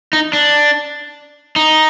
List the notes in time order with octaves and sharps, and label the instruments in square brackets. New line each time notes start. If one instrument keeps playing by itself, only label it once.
[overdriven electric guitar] D#4
D4
D#4